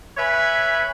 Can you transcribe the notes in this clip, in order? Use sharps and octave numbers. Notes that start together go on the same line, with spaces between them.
B4 C#5 E5 G#5 B5